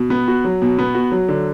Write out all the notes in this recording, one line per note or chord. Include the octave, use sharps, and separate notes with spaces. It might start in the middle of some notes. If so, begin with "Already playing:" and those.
Already playing: B2
B3
F#4
F#3
B2
B3
F#4
F#3
D3